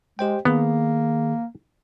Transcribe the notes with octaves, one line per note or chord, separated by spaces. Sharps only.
G#3 G4 C5 G5
D#3 A#3 B3 G#4